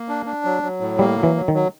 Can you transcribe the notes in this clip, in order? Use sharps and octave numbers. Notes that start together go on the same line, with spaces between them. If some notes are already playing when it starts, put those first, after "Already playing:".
Already playing: A#3
D4
D4
F#3
F#3
A2
G3 A#3
F#3
E3
F#3
D#3
F#3